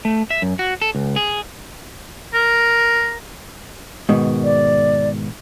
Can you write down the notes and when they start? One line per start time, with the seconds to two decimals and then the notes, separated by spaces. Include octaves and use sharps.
0.05 A3
0.31 E5
0.42 F#2
0.59 F#4
0.82 A4
0.95 C#2
1.16 G#4
2.34 A#4
4.09 G#2 B2 D#3
4.44 D5